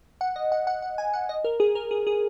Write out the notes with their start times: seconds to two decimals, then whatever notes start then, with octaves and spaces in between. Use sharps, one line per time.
0.21 F#5
0.36 D#5
0.52 F#5
0.67 F#5
0.82 F#5
0.98 G#5
1.13 F#5
1.29 D#5
1.44 A#4
1.60 G#4
1.75 A#4
1.91 G#4
2.07 G#4